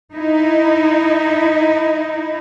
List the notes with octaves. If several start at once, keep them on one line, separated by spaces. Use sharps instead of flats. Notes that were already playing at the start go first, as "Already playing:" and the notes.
D#4 E4